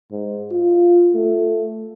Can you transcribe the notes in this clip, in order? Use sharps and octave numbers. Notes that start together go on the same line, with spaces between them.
G#2
F4
A3